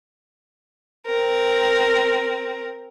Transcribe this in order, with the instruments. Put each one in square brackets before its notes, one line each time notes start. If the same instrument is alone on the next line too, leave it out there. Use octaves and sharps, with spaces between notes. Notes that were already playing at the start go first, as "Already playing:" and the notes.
[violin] C4 A#4